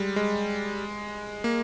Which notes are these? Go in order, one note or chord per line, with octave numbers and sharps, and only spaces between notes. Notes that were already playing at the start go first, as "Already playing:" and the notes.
Already playing: G3 G#3
G#3
A#3